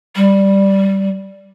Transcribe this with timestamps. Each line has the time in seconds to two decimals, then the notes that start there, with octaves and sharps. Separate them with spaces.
0.16 G3